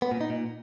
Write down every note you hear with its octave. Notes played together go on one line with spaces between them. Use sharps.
B3
A#2
D#4
A#2